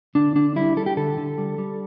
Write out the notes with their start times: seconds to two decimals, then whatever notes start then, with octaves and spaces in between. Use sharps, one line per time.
0.15 D3 D4
0.35 D3 D4
0.56 G3 E4
0.76 G3 A4
0.86 G4
0.97 D3 A4
1.18 D3
1.38 G3
1.58 G3